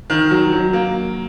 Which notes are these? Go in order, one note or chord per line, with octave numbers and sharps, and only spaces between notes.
D#3
F#3
F#3
A#3